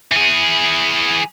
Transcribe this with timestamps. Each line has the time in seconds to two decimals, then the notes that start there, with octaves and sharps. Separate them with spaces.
0.11 E3 G#4